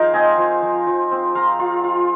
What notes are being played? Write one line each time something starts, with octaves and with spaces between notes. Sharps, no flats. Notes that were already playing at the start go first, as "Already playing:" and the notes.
Already playing: F3 D#4 G#4 A#4 C5
C4 D#5 G#5
F3
F3
F3
C4
F4 F5 A#5
F4
F4